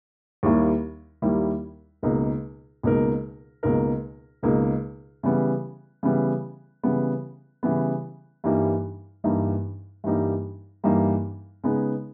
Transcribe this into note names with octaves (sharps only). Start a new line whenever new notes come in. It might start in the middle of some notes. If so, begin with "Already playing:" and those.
D#2 D#3 G3 A#3 E4
D#2 D#3 G3 A#3 E4
C#2 B2 A#3 D#4 A#4
C#2 B2 A#3 D#4 A#4
C#2 B2 A#3 D#4 A#4
C#2 B2 A#3 D#4 A#4
C#3 E3 G3 B3
C#3 E3 G3 B3
C#3 E3 G3 B3
C#3 E3 G3 B3
G2 E3 G3 A#3 D#4
G2 E3 G3 A#3 D#4
G2 E3 G3 A#3 D#4
G2 E3 G3 A#3 D#4
C#3 G#3 B3 D#4 G#4